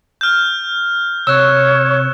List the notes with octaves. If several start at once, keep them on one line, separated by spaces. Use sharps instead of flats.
F6 G6
C3 C#5 E6 F#6 E7